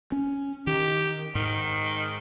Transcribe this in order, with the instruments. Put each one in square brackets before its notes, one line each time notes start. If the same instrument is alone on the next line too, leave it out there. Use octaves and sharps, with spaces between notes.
[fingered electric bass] C#4
[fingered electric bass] D#3 [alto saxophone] G4
[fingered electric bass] G#2 [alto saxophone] D#3